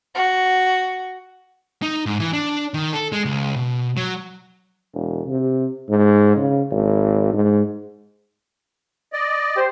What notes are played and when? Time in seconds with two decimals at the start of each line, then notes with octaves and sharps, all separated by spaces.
0.15 F#4
1.82 D#4
2.06 G#2
2.20 E3
2.33 D4
2.74 D#3
2.93 A4
3.12 G#3
3.25 C#2
3.56 B2
3.97 F#3
4.94 E1
5.27 C3
5.89 G#2
6.36 C#3
6.71 G#1
7.33 G#2
9.13 D5 D#5
9.56 G4 C5